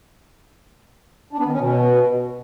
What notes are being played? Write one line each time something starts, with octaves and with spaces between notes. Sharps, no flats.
D4
B3
D#3
C#4
B2